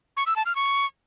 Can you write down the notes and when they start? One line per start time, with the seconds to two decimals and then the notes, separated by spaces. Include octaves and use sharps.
0.17 C#6
0.26 E6
0.36 A5
0.46 F6
0.56 C#6